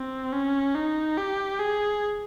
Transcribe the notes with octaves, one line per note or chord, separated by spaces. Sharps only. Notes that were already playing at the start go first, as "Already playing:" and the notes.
Already playing: C4
C#4
D#4
G4
G#4